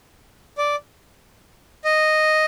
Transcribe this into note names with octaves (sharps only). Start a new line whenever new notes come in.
D5
D#5